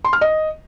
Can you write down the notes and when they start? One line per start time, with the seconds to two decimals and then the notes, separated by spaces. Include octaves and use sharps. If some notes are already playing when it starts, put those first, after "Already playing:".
0.05 C6
0.13 F6
0.21 D#5